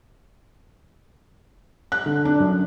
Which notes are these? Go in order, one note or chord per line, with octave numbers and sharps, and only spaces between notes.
F#6
D3
D4
F#2